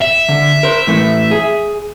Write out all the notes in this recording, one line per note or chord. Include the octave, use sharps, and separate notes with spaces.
E5
D3
A#4 C5
A2 E3 A3
G#4